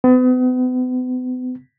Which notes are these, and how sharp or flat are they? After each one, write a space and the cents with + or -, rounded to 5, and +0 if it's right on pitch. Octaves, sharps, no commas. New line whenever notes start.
B3 +40